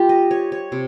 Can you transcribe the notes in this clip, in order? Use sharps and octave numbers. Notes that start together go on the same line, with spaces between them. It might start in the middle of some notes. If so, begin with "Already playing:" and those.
Already playing: G3 F4 G4
D#5
C#5
C#5
C3